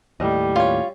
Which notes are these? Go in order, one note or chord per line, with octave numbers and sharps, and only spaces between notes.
D#2 A2 G3 D#5
C#4 F4 C#5